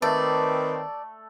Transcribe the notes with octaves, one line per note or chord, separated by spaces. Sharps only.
D#3 A3 C4 B4 D5